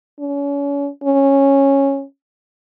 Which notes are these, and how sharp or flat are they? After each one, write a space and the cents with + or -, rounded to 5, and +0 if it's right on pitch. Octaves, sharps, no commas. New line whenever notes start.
C#4 +35
C#4 -10